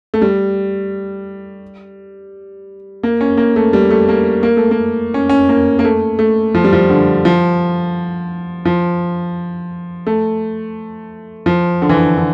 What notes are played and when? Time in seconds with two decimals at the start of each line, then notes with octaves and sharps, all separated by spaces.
0.14 A3
0.22 G3
3.03 A#3
3.21 C#4
3.37 A#3
3.56 A3
3.73 G3
3.90 A3
4.09 A#3
4.43 A#3
4.57 A3
4.71 A#3
5.14 C#4
5.29 C#4
5.49 A#3
5.79 A#3
5.85 A3
6.19 A3
6.55 F3
6.64 G3
6.73 F3
6.90 D3
7.25 F3
8.65 F3
10.07 A3
11.46 F3
11.82 D3
11.89 E3
11.96 D3
12.17 D3